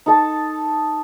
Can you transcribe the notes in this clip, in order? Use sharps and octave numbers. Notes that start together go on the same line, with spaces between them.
D#4 A4 A5